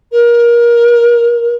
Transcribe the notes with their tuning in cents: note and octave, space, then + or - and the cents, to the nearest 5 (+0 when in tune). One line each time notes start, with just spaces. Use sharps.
A#4 +25